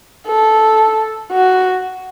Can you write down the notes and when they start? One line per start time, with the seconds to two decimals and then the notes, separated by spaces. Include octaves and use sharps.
0.27 A4
1.32 F#4